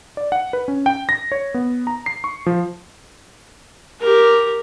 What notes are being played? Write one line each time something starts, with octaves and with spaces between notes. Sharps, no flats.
D5
F#5
B4
C#4
G5
A#6
C#5
B3
A#5
C7
C#6
F3
G4 A#4